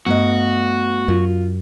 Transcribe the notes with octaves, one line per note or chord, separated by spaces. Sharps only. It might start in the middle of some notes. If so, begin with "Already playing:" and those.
G2 A3 B3 F#4 D#5
F#2 F4